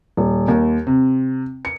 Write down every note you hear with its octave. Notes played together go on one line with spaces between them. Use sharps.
D#1
D#2
C3
C#7